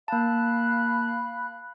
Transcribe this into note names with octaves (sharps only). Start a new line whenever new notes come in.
A#3 F5 A5 B5 F#6